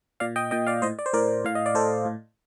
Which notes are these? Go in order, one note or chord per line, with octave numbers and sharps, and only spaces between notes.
A#2 D5 F5
D#5 G5
A#2 D#5 G5
D5 F5
A2 C5 D#5
D5
C5
A2 A#4 D5
A2 F5
D#5
D5
A2 A4 C5
A2